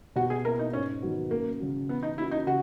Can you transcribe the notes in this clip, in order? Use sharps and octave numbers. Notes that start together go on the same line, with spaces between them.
B2 F#4
G#4
A#3 E4 A#4
D#4
G#2 C#4
D#3 F#3 B3 F#4
F#2 A#3
C#3 F#3 C#4 F#4
E3 B3
D#4
A#3 C#4 E4 F#4
D#4
C#3 F#4